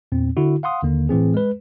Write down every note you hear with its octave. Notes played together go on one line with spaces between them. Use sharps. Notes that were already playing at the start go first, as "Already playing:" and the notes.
E2 A#2 C4
D3 E4 F#4
F5 F#5 C6 D#6
D#2 D3 A#3
A2 E3 C4 G#4
G#3 B4